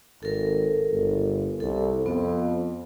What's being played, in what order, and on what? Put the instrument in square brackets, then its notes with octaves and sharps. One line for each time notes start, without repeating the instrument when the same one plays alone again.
[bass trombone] G#1 [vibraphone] A4 A#4
[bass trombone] G1
[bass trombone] C2 [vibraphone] A4
[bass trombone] F2 [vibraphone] B3